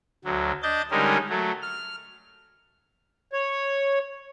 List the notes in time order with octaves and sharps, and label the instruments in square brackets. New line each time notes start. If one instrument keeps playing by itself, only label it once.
[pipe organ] D2 F#3
D4 D#5 G6 A6
D3 G3 G#3 C#4 D#4 A#4
F#3 A3
F6
[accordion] C#5